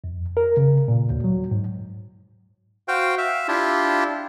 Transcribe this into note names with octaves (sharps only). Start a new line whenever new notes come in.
F2
A#4
C#3
A#2
D2
F#3
G#2
F#4 C5 F5 G5
E5 F5
D4 E4 F4 G4